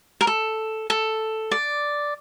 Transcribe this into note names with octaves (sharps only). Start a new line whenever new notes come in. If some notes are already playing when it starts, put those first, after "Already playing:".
A#4
A4
A4
D5